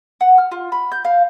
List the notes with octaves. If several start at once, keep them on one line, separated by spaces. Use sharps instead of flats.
F#5
F6
F4
B5
G6
F5